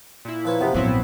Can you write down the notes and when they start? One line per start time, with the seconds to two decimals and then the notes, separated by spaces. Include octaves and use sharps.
0.25 A#2 E4
0.45 F3 B4 C#5
0.61 F#2 C3 F3 B3
0.74 A#1 G#2 F#3 B3 C4 E4